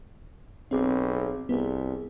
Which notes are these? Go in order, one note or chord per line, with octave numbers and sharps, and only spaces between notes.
B1 C4 G#4 D6
C2 B3 G#4